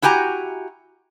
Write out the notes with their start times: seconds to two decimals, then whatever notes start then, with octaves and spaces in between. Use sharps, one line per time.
0.02 E4 F#4 G4 G#5 A#5